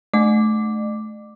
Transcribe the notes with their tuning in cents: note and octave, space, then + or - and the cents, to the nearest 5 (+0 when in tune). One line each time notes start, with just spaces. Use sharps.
A3 -25 D5 +45 D6 +0